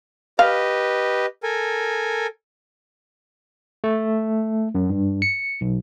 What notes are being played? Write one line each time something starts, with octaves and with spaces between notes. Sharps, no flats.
G4 B4 D#5 F5
A4 A#4 G#5
A3
F#2
G2
C#7
B1